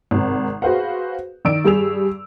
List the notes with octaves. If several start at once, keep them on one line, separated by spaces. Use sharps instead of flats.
G#1 C3
F#4 G#4 B4 C5 F5 F#5
D#3 D5 E6 D7
G2 G3 G#4 E6 F7